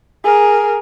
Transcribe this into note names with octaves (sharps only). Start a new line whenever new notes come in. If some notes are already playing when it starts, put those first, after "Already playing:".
G#4 A#4